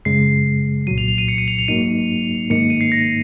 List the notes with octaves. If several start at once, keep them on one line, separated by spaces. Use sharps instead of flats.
F#2 C#3 G#3 C7
C2 A#2 F#3 D#7
F7
F7
D#7
C#7
D#7
F7
F7
G#2 F#3 A#3 D#4 D#7
G#2 D#3 A#3 D#4 C#7
D#7
C7
A#6